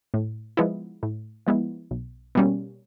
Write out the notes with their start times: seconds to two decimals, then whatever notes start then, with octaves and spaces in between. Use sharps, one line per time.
0.14 A2
0.57 F3 G#3 B3 E4
1.03 A2
1.47 F3 G#3 B3 E4
1.91 B1
2.35 B2 G3 A#3 C#4